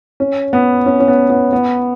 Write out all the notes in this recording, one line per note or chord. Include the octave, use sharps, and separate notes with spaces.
C#4
B3
C#4
C#4
B3
B3
B3